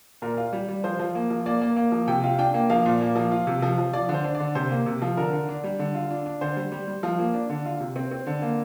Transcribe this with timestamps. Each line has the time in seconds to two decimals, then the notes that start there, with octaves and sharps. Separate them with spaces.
0.22 A#2 A#4
0.37 F4
0.53 G3
0.68 G3
0.84 F3 C5
0.99 F3
1.15 A#3
1.30 F3
1.46 A#3 D5
1.61 A#3
1.76 A#3
1.92 F3
2.08 C3 G5
2.23 F4
2.39 D4 G5
2.54 A#3
2.70 F3 F5
2.85 A#2
3.01 A#3
3.16 F3
3.32 F4
3.47 C3
3.62 F3
3.78 F3
3.93 F3 D5
4.09 D3
4.14 C5
4.24 D4
4.35 D5
4.40 D3
4.55 C3 C5
4.71 A#3
4.86 C3
5.02 F3
5.17 D3 A#4
5.33 D3
5.49 D4
5.64 G3
5.79 D3
5.95 F4
6.11 D4
6.26 D4
6.41 D3 C5
6.57 G3
6.72 G3
6.87 G3
7.03 F3
7.19 A#3
7.34 D4
7.49 D3
7.65 F4
7.80 C3
7.96 C4
8.11 C4
8.27 D3
8.42 A#3